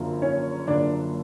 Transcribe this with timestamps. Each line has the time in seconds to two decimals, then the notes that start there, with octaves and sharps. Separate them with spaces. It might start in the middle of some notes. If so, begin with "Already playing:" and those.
Already playing: F#1 F#2 D3 F3 A#3
0.22 C#4 C#5
0.67 F#1 F#2 D3 F3 A#3 D4 D5